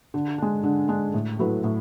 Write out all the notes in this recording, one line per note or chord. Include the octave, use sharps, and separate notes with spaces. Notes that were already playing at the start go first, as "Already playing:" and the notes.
D3
G#3 D4
D3
G#3 D4
A2
F#3 A3 E4 B4
A2